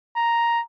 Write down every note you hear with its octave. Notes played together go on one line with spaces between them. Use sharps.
A#5